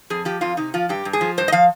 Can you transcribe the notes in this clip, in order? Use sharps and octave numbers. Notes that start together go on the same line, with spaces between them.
F2 G#4
F3 G4
F2 F4
C3 D#4
F3 F4
G2 G4
G2
G#4
F3
G2 C5
D#5
F3 F5